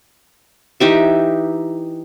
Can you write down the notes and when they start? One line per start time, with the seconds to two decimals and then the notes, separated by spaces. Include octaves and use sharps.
0.80 E3 D#4 G4 E5